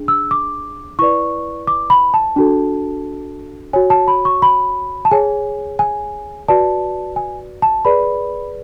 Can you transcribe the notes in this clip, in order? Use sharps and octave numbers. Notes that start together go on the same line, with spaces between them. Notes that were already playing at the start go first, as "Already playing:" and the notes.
Already playing: D4 G#4
E6
D6
E4 B4 D5 C#6
D6
B5
A5
D4 F#4 A4
F#4 C#5 G#5
A5
B5
C#6
B5
A5
G#4 C#5 G#5
G#5
F#4 B4 D5 A5
G#5
A5
G#4 B4 D5 B5